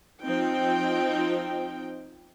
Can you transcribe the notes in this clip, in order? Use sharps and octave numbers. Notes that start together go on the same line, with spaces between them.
F3 C4 D#4 G5